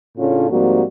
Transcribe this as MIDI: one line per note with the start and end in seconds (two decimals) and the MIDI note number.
0.18 0.49 45
0.18 0.49 49
0.18 0.49 57
0.18 0.49 61
0.18 0.49 62
0.18 0.49 65
0.50 0.82 44
0.50 0.82 53
0.50 0.82 55
0.50 0.82 58
0.50 0.82 60
0.50 0.82 66